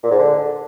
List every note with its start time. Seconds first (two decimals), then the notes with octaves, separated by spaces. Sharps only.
0.03 A#2
0.11 G#2
0.19 D3